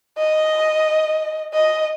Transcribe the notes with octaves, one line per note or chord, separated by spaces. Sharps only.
D#5
D#5